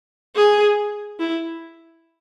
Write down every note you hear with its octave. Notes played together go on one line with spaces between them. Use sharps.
G#4
E4